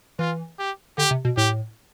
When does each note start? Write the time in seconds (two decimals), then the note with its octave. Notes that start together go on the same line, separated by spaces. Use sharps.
0.19 E3 F4
0.59 G4
0.98 D3 G4
1.11 C3
1.25 B2
1.37 A2 G4